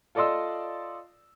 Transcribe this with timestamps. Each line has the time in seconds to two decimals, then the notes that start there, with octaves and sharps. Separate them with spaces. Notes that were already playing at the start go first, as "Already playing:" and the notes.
0.15 F4 A4 D5 D#5 C6 E6